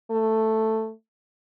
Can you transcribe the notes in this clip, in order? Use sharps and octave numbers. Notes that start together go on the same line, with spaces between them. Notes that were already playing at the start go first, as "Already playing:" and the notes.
A3